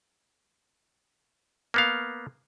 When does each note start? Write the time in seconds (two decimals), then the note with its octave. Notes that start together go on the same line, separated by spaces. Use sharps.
1.74 A#3 B3 F5